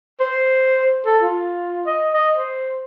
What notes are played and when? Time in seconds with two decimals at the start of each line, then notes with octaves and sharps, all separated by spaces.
0.20 C5
1.06 A4
1.23 F4
1.86 D#5
2.13 D#5
2.37 C5